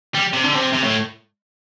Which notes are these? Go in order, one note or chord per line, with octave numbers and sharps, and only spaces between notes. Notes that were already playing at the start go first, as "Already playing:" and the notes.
G3
C3
D3
C3
C3
A2